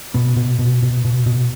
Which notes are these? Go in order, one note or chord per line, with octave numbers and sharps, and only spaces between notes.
B2 B3
B2
B2
B2
B2
B2